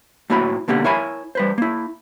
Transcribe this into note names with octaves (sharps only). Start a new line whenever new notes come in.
A2 A#3 E4 F#4 C#5 B5
B2 D3 A#3 G4 F#5
E4 A#4 C#5 E5 G#5 B5
G3 B4 C5
A#3 E4